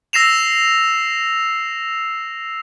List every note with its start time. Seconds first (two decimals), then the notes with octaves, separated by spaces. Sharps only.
0.13 E6 A#6 C7 E7 F7